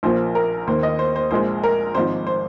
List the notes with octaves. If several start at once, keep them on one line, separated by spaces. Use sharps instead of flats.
A#1 A#2 F3 A#3 C5
A#4
D#2 D#3 A#3 C5
D#5
C5
C5
A#1 A#2 G#3 C5
A#4
G#1 G#2 F3 C5
C5